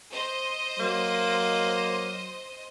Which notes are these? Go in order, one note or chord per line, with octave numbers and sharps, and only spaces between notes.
C5 D#5
F#3 A#3